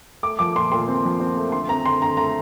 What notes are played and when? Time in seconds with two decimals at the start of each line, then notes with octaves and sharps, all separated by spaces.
0.23 A3 D6
0.39 F3 D6
0.55 A#2 C6
0.72 A#2 C6
0.88 C4
1.05 F3
1.20 C4
1.37 A3
1.52 D3 C6
1.68 C4 A#5
1.85 D3 C6
2.02 D3 A#5
2.17 A3 A#5